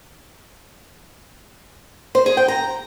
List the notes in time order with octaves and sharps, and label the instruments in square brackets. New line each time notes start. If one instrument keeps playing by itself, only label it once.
[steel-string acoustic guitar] C5
G#4
G5
A#5